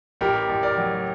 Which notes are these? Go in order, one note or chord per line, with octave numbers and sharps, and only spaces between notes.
A1 G4 A#4
A1
A#4 D5
F#3